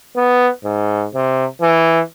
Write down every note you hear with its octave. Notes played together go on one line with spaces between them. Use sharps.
B3
G#2
C3
E3